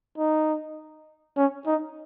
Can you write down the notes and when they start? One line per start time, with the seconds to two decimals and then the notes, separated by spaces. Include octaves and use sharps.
0.18 D#4
1.37 C#4
1.66 D#4